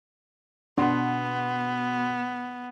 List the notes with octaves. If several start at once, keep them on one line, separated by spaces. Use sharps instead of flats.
B2 B3 D4 F#5 C6